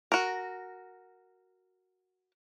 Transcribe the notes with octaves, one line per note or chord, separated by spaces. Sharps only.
F#4 A#4